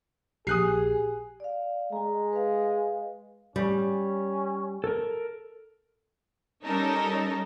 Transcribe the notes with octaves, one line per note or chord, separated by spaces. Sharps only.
A#1 G4 G#4 D#6 F#6 C7
D5 F5
G#3 G#5 A#5
B4 F5
G3 C#4
A4 A#4
G3 C#4 D#4 A4 A#4 D#5